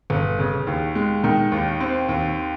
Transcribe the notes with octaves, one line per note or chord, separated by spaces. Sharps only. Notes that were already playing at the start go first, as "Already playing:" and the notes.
G1
C#3
D#2
G#3
D#3
D#2
C4
D#2